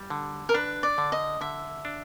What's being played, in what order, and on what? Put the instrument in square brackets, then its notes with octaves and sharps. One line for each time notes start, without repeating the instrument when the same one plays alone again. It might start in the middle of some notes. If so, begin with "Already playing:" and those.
Already playing: [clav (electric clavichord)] G3
D3
[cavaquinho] A#4
[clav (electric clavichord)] D4 [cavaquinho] B4
[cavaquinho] D5
[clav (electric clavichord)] D3
[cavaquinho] D#5
[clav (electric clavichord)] D3 [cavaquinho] E5
[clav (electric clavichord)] D4